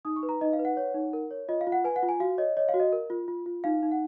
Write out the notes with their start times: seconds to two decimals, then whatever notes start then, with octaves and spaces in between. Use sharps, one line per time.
0.05 D#4 D#6
0.16 C#6
0.23 B4
0.29 A#5
0.41 D#4 D#5
0.53 F5
0.59 B4
0.65 F#5
0.77 C#5
0.94 D#4
1.13 A#4
1.31 C#5
1.49 F4 D#5
1.61 F5
1.67 F4
1.72 F#5
1.84 B4 G#5
1.96 F#5
2.03 F4
2.09 G#5
2.20 F#4 F5
2.38 C#5 D#5
2.57 C#5 D#5
2.69 F5
2.74 F#4
2.80 D#5
2.93 A#4
3.10 F4
3.28 F4
3.46 F4
3.64 D#4 F5
3.83 D#4
3.92 F#5